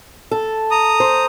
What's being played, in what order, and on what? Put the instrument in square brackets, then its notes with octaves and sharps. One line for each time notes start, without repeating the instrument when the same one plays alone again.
[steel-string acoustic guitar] A4
[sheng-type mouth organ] A#5 D#6
[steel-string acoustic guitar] C5